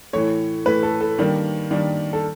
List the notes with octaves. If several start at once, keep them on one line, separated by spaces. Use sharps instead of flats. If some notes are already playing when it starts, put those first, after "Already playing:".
A2 E3 A3 C#5
A2 E3 A3 B4
A4
A4
D#3 G3 A#3 D4
D#3 G3 A#3 D4
A4